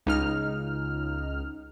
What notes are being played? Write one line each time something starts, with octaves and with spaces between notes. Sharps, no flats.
C#2 D#4 F6